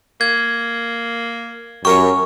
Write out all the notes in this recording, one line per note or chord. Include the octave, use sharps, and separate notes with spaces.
A#3 G#6
F#2 G4 A#4 C#5 C#6